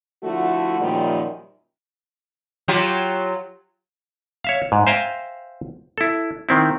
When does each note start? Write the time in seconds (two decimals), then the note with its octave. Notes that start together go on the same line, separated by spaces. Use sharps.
0.23 D3 F3 A3 E4 F#4
0.81 F#2 A#2 D#3 F3 G3
2.68 F#3 F4 G4
4.44 C#5 E5 F5
4.72 G#2
4.87 C5 E5 F5 G5 G#5 A#5
5.98 E4 A4
6.49 D#3 C4 E4